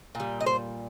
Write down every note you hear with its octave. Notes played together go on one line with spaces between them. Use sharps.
A#2 G3
D#5
C5